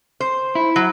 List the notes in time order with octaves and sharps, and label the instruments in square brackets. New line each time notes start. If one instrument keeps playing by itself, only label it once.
[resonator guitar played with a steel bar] C5
[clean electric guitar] E4
[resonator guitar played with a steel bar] F#3